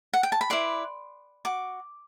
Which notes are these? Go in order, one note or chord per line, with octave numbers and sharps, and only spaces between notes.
F#5
G5
A5
B5
E4 B4 D5 C6
F#4 D6